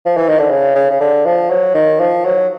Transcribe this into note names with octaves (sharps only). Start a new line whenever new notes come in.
F3
E3
D#3
D3
C#3
C#3
C#3
D3
F3
F#3
D#3
F3
F#3